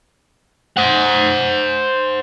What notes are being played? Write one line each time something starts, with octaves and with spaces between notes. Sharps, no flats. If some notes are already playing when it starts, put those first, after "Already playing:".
C5 F#5